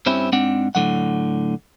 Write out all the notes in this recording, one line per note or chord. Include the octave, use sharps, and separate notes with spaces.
G2 G3 C4 C#4 E4
G#2 C4 D4 F#5
A2 D3 F#3 F#5